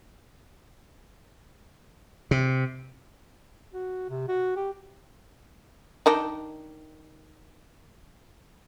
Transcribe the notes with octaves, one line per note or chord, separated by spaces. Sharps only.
C3
F#4
C3
F#4
G4
D#3 D4 D#4